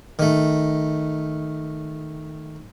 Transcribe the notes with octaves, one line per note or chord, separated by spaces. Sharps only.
D#3 A3